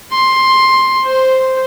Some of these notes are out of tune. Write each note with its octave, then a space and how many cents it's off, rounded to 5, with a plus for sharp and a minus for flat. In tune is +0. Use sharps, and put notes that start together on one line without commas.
C6 +10
C5 +0